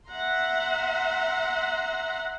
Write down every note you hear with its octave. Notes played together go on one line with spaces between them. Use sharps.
E5 F#5 A#5 C6